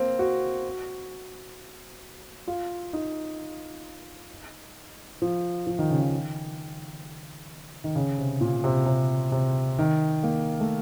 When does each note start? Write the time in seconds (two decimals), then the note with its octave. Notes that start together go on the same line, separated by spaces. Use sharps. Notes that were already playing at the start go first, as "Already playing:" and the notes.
Already playing: A#3 C4
0.19 F#4
2.48 F4
2.93 D#4
5.22 F3
5.67 F3
5.79 D#3
5.90 C#3
6.02 D#3
7.84 D#3
7.95 C#3
8.18 C3
8.41 A#2
8.64 C3
8.86 C3
9.32 C3
9.79 D#3
10.23 A#3
10.60 A3